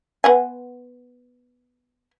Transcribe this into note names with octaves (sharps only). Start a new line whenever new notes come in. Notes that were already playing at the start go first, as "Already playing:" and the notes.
B3 F#5 G#5